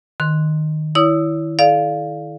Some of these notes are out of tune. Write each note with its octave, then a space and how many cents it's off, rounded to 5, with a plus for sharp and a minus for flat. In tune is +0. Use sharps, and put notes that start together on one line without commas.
D#3 -15 C6 +0
E4 +0 C#5 +40 D#6 -10
A4 -40 D5 +0 F5 +0